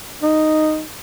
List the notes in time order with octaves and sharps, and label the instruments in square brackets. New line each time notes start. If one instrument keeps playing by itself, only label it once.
[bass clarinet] D#4